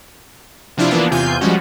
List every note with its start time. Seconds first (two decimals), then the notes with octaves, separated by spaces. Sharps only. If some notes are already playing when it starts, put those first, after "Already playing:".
0.77 C3 F3 D4 E4 F4
0.91 E3 F3 A#3 B3 D4
1.11 E2 C3 F4 G#5 G6
1.41 F3 G3 G#3 C#4 F#4